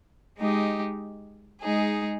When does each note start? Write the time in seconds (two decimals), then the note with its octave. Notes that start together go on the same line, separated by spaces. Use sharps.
0.37 G#3 D#4 G4
1.60 G#3 D#4 G#4